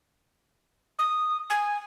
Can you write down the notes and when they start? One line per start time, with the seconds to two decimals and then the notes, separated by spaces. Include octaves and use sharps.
0.99 D#6
1.50 G#5